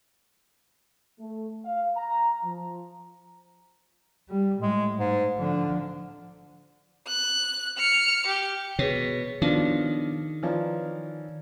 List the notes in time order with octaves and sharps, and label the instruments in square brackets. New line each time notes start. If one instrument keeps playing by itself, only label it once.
[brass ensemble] A3
F5
A#5
F3
[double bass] G3
[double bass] A2 [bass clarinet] G#3
[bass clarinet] G#2
[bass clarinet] D3 [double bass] F3 D4
[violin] F#6
F6 C#7
G4
[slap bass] B2 [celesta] G#4 B4 C#5
[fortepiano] B2 F3 D4 [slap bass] D#3
[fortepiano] E3 F3 D#4 [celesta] C#5 D5